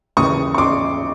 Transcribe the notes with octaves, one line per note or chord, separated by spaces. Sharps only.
D#2 C#3 E3 C#6 D#6
C#6
C6 D6